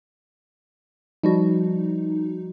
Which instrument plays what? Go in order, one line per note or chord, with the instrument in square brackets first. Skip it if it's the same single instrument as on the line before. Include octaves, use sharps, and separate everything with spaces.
[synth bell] F3 G3 F#4 [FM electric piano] D#4